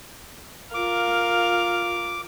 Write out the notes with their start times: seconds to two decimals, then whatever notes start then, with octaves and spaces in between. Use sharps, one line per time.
0.74 F4 A#4 F5 D6